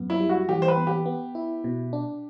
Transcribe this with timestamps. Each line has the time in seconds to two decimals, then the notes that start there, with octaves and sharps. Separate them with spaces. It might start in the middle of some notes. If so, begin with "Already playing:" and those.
Already playing: F#2 B3
0.10 E4
0.20 G3
0.29 F#4
0.49 E3 G4
0.62 C5
0.68 B4
0.77 B3
0.87 G4
1.06 B3
1.35 E4
1.64 B2
1.93 D4